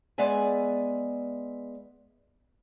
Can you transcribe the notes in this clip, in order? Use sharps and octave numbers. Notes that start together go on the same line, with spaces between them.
G#3 B3 D5 E5 G#5